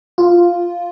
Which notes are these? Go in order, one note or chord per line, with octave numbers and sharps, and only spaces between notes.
F4